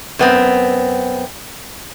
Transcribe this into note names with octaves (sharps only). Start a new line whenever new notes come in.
F#2 B3 C4